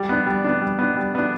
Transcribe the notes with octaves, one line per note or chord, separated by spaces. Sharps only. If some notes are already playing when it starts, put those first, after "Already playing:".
Already playing: G3
B3 D4
G3
B3 D4
G3
B3 D4
G3
B3 D4